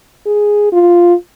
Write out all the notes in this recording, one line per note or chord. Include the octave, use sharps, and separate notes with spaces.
G#4
F4